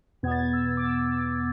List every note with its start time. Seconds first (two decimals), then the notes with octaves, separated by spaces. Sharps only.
0.23 E2 B2 B3 G#6
0.31 A6
0.39 G#6
0.53 E6
0.77 D6
0.84 E6
1.09 E6
1.15 D6